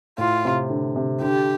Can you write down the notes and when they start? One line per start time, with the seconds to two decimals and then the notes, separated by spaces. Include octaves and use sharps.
0.18 A2 F4
0.45 C3
0.70 D3
0.96 C3
1.21 D3 G4